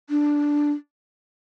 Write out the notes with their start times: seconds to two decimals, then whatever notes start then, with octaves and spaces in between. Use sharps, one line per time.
0.10 D4